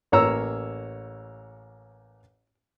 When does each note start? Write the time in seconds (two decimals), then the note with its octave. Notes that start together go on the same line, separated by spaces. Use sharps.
0.12 A1 A#3 C#5 A#5 E6